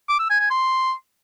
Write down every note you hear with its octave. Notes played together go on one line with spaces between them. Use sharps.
D6
E6
G#5
G#5
C6